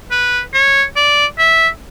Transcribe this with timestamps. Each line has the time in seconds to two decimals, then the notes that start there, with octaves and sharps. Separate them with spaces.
0.11 B4
0.54 C#5
0.96 D5
1.38 E5